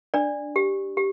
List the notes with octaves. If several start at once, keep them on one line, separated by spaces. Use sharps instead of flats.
D4 D5
G4
G4